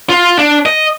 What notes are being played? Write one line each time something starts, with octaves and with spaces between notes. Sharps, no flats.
F4
D4
D#5